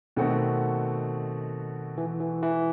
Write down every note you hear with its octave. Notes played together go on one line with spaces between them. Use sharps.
B2 D#3 A3 C4 F#4
E3
E3
E3